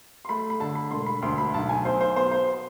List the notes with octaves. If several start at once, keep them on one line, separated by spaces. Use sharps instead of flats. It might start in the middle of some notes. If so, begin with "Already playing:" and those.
C6
A3 B5
B5
D3 A5
B5
E1 C6
B5
D2 C6
B5
B1 A5
G#5
B2 C5
C5
B3 C5
C5